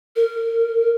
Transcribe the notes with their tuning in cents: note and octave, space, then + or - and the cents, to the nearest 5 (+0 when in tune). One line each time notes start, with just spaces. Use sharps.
A#4 -25